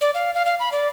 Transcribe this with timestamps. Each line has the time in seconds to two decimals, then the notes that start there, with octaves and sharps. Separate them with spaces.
0.01 D5
0.14 F5
0.34 F5
0.46 F5
0.60 B5
0.72 D5